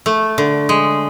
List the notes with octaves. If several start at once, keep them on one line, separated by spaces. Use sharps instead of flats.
A3
D3
G#3